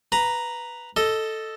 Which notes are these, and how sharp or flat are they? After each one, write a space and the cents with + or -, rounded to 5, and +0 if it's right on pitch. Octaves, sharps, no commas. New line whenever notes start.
B4 +0 A#5 +0
A4 +0 D#5 +0